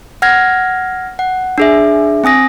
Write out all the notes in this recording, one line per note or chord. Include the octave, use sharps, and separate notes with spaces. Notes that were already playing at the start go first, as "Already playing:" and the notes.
F#5 F6 G#6 A#6
F#5
D4 G#4 E5
C4 G#5 D#6 A#6